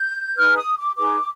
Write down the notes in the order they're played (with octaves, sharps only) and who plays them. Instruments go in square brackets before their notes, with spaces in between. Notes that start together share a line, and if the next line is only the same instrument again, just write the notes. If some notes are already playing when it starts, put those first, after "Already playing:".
Already playing: [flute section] G6
D#4 G#4 B4 F6
D#6
D6
D#4 G#4 B4 D6